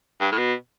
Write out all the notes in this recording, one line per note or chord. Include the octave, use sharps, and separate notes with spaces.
G2
A2
B2